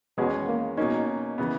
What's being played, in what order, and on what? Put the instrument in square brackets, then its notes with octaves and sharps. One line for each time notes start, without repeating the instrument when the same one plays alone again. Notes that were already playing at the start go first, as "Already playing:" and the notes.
[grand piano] E2 D#3 G#3 C#4 G#4 [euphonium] B2
[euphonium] A#3
[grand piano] B2 F#3 A#3 C#4 [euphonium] D#4
[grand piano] C#3 E3 B3